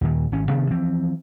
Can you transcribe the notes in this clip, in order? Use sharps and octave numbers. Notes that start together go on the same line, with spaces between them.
D#2 A#2 D#3
G#1 C#4
C3 D#3 B3 D4
E3 F3 C4